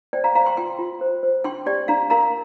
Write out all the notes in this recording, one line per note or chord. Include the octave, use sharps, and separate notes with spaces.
C5 D5 G5
F5 A#5
C5 F5 A#5
G5 C6
F4 G5 C6
F4
C5
C5
D4 G5 C6
G4 D5 G5
D4 F5 A#5
A#4 F5 A#5